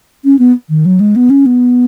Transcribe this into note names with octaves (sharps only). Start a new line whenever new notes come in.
C#4
B3
D#3
F#3
G#3
B3
C#4
B3